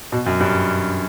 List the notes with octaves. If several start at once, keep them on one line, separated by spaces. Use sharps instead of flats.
B2
F#2
G2